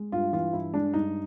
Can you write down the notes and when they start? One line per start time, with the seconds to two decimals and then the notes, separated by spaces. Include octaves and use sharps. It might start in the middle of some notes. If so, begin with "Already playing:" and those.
Already playing: G#3
0.12 G2 F4
0.33 E3 F4
0.53 G2 E4
0.73 G#3 D4
0.94 G2 D#4